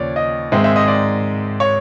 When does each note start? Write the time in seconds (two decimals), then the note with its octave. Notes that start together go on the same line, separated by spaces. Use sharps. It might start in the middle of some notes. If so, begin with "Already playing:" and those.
Already playing: D#2 C#3 F3 C#5 D5
0.16 D#5
0.52 G#2 D#3 G#3 C4 E5
0.64 E5
0.76 D#5
0.88 D5
1.60 C#5